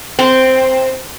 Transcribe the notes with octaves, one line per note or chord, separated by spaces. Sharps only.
C4